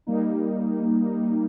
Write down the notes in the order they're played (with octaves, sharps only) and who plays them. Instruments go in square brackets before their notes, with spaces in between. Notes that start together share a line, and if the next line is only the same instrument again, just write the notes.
[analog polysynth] G3 A#3 D#4